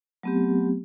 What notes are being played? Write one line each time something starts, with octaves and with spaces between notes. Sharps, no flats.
F#3 A3 B3 C4 G4